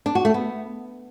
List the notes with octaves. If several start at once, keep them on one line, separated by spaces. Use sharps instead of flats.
D4
F#4
A3
B3